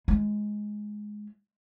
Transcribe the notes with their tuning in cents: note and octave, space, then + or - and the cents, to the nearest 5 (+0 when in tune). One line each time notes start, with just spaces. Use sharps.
G#3 +10 F4 -35